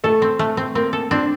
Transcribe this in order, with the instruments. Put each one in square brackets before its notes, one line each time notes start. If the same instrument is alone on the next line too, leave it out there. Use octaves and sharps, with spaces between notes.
[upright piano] A3 [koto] A4
[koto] C4
A3
C4
[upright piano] A#3 [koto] C4
[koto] A4
[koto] C4 [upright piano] D4